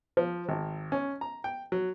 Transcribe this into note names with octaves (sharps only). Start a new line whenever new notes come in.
F3
G#1
C#4
A#5
G5
F#3